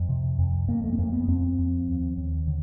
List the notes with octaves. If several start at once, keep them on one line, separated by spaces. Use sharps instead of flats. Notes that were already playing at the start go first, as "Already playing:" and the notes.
Already playing: F2
C3
F2
F2 A#3
A3
B3
F2 A#3
B3
F2 C4
F2
D#2
D#2
D3